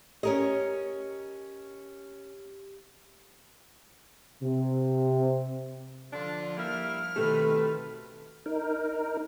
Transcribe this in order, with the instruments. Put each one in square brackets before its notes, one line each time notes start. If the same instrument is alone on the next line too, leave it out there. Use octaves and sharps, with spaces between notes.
[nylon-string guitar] C#4 A#4 D#5 [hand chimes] G4
[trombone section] C3
[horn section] D3 D4 F4 [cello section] F3
[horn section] G3 A#3 E4 [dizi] F6
[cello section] B2 D#3 B4 [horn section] A3 C4 [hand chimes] G4 A4
[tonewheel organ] D#4 A#4